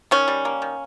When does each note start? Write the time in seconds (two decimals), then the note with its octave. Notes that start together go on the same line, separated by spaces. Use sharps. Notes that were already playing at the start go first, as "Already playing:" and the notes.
0.11 D#3 C#4
0.28 G3
0.45 A#3
0.62 D#3